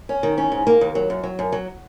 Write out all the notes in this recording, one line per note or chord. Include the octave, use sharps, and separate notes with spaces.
C#4
D#3
C#4
G#2
A#3
D#2
F#3
F#2
F#3
F#2
F#3